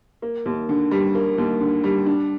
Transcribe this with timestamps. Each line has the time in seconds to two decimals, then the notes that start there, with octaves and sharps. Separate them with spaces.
0.22 A#3
0.46 D#2
0.69 D3
0.91 G3
1.15 A#3
1.38 D#2
1.61 D3
1.84 G3
2.06 D4